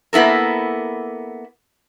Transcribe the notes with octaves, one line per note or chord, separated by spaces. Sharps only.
A#3 B3 E4 A4 A#4